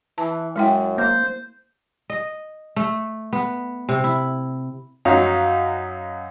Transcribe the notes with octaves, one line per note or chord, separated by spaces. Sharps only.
E3 A5
F#2 G#3 E4 G5
A#3 C5
D#5
A3
B3
C3
E4
F#2 F#3 D#4 F5